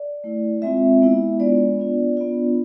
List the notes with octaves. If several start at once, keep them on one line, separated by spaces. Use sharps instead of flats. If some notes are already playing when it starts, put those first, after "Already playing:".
Already playing: D5
A3 E4
G#3 C4 F4 E5
G#3 B3 E4
G#3 B3 D4 F4 D5
B3 D4 F4
B3 D4 F4